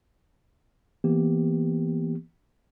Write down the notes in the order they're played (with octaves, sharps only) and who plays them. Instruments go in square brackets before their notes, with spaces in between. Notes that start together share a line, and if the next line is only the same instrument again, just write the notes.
[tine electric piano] E3 A#3 B3 G4